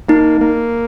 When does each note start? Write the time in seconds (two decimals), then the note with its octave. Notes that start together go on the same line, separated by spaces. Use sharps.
0.09 A#3 D#4
0.41 A#3